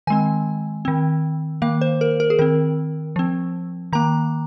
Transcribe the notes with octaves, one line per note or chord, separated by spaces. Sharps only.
D#3 G#3 C4 G#5
D#3 C4
D#3 A#3 F5
C5
A#4
A#4
G#4
D#3 C4 A#4
F3 C4
D#3 A#3 A#5